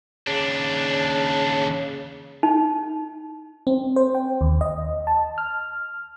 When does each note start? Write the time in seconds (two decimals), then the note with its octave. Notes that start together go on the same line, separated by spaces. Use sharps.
0.27 D#2 C#3 D4
2.43 D#4
3.67 C4
3.96 C5
4.15 G5
4.41 D#2
4.61 D#5
5.07 A5
5.38 F6